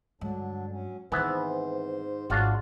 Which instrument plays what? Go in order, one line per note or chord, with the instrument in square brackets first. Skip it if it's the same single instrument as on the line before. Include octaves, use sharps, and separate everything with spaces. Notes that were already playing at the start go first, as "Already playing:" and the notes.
[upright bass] G2 G#3 [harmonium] D3 F#3 D4
[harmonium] F#3 C#4
[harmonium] G#2 C5 [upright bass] D#3 C4 [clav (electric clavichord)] E3 B3 E5
[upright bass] G#1 G#2 [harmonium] F#3 G#4 F#5 [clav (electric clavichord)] D4 F4 F#4